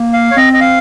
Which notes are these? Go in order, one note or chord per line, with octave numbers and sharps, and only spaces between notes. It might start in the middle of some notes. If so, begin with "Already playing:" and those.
Already playing: A#3
F5
C#5
C4 D#5
D#5
F5